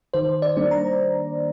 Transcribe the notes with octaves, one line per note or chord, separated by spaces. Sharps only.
D#3 C5
D5
G3 A#3 D4
A#5